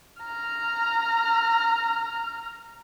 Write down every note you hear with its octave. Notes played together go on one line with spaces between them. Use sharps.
A#5 F6